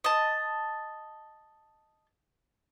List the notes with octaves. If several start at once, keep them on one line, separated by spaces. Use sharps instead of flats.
D#5 A5